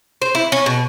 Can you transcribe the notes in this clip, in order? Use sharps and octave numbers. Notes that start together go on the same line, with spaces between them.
C5
E4
C#4
B2